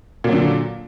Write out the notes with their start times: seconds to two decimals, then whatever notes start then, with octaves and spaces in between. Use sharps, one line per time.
0.24 A#2
0.28 F#3
0.33 D3